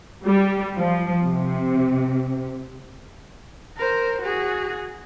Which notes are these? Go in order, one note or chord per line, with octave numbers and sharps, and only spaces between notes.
G3
F3
C3
A#4 C5
F#4 G#4